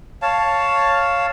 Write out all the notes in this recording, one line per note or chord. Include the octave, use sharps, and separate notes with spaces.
C#5 F5 A5